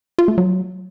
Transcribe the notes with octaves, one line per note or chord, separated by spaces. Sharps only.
F4
A3
F#3